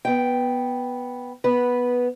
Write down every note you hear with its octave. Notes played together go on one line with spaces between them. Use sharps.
B3 G5
B3 B4